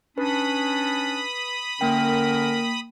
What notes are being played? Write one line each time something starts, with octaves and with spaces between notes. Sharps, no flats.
C#4 D4 B4 B5 D#6
D3 A#3 C#4 A#4 G5